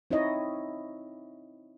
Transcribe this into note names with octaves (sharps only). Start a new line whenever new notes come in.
C4 D#4 E4 C#5 D#5